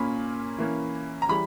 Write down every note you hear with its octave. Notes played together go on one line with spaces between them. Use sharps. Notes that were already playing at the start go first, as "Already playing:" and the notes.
Already playing: A#2 A#3 C#4 B5
E3 A#3 C#4
A#5
E3 G3 B5